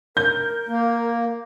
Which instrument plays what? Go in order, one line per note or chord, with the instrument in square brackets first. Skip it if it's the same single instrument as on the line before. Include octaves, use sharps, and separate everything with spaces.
[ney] A#4 [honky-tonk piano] G6
[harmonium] A#3